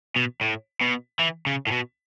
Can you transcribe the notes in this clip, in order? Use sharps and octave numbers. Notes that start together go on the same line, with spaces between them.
B2
A2
B2
E3
C#3
A2
B2